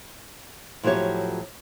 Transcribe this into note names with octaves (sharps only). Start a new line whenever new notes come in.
A2 F3 F#3 G4 C#5